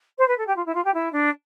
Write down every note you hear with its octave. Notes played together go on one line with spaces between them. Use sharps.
C5
B4
A4
G4
F4
E4
F4
G4
E4
D4